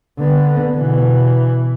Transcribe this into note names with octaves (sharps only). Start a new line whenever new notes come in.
D3 B3
B2 E3